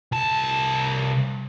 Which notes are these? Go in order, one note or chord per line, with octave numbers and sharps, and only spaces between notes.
C2 A5